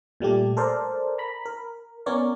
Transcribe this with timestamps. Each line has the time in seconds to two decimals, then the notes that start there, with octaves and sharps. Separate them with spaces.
0.20 A#2 G3 A3 G4
0.57 A4 A#4 C5 D5
1.18 A#5 B5
1.45 A#4
2.06 B3 C#4 A#4 C#5 D5